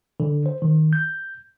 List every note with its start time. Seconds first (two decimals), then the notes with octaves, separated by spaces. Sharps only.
0.20 D3
0.46 C5
0.62 D#3
0.93 G6